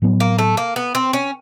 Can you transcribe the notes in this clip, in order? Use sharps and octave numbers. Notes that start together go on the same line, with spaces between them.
A2 F#3 B3
A#3
A3
A#3
B3
C4
C#4